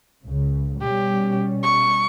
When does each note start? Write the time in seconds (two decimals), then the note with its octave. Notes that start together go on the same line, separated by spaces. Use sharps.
0.25 C#2 C#3
0.81 B2 G3 C#4 G4
1.63 C#6